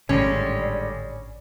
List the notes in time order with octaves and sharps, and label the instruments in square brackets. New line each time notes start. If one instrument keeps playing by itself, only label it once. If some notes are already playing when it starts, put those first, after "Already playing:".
[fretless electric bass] G#1 A2 D#3 [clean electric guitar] D3 G3 G#3 [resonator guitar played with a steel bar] C#4 [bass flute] D5